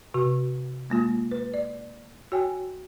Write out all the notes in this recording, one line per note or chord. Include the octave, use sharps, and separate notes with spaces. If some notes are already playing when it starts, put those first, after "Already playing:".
C3 F#4
G#3 A#3 F4
B4
D5
F#4 C#5 G5 G#5